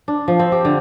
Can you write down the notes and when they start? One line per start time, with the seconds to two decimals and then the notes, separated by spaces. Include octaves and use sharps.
0.08 D4
0.28 F3
0.39 C4
0.52 G4
0.65 D3